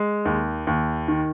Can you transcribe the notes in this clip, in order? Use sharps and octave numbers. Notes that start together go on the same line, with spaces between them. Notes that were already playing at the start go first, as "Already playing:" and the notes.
Already playing: G#3
D#2
D#2
D#3